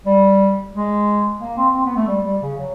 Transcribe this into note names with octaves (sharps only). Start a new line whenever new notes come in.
G3
G#3
A#3
C4
C4
B3
A3
G3
G3
C#3
F#3